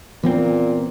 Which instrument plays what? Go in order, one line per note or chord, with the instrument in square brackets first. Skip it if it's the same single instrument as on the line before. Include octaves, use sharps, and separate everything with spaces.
[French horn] A#2 [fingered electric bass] E3 B3 C4